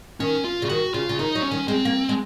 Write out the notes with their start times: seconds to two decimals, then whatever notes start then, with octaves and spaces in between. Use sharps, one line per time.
0.20 D#3 C#4
0.44 F4
0.62 C#3
0.66 F4
0.69 D#3 F#4
0.94 C#3 F4
1.09 C#3
1.19 D#3 D#4
1.35 F#3
1.43 C#4
1.52 D#3
1.68 G#3 C4
1.85 A#3
2.09 G#3